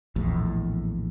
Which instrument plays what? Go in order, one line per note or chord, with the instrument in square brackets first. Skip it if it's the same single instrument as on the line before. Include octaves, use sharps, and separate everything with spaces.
[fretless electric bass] A#1 E2 A2